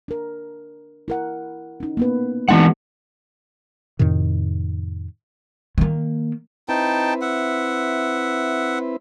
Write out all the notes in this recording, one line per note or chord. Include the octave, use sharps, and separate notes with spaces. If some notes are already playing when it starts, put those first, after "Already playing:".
D4 A#4
E4 A#4 F#5
C#4 D#4
A#3 B3 B4
E3 G#3 B3 D#4 F#4 F#5
F2 A2 C3 D#3
D#3 A#3
C4 D#4 E4 B4 G5 A5
E5 F#5